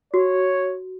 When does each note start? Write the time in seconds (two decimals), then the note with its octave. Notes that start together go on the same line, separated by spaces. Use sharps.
0.14 F#4 C#5